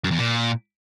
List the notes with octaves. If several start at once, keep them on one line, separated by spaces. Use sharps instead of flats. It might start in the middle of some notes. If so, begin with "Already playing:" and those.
F#2
E2
A#2